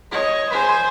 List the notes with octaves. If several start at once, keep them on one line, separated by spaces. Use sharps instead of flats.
C#5 D#5
C5 G#5